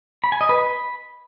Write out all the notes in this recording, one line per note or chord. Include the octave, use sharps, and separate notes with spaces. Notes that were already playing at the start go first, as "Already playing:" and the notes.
B5
G#5
D#5
B4
B5